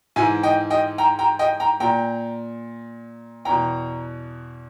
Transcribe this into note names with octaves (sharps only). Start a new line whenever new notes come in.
G#2 E3 E5 G#5
D#5 G5
D#5 G5
G5 A#5
G5 A#5
D#5 G5
G5 A#5
A#2 G5 A#5
E2 B2 G5 A#5